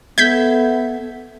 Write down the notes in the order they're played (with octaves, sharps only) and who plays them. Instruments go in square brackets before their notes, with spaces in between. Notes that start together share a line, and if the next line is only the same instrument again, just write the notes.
[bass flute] B3 [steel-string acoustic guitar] A4 E5 [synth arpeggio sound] G6 G#6 B6